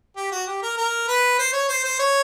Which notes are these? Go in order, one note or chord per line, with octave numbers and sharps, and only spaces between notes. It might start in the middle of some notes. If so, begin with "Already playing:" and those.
G4
F#4
G4
A#4
A#4
B4
C5
C#5
C5
C5
C#5